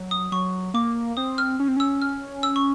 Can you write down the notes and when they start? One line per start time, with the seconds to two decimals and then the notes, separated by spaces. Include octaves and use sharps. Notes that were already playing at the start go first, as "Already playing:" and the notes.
Already playing: F#3
0.11 D#6
0.32 F#3 C#6
0.74 A#3 D6
1.17 C4 D#6
1.38 F6
1.60 C#4
1.68 C4
1.76 C#4 E6
2.02 F6
2.43 E6
2.56 C#6